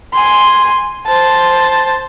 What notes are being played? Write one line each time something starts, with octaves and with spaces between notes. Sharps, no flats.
G#5 C6
C5 A5